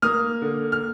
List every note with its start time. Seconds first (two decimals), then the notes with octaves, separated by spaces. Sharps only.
0.02 A#3 D#6 F6
0.42 D3
0.72 F6